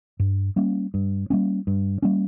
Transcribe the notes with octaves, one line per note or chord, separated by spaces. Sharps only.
G2
G3 A#3 C#4
G2
G3 A#3 C#4
G2
G3 A#3 C#4